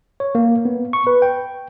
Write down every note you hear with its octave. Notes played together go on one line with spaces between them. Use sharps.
C#5
A#3
B3
C#6
B4
G5